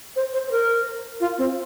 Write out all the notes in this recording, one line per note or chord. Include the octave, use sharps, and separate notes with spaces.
C5
C5
C5
A#4
F4
C4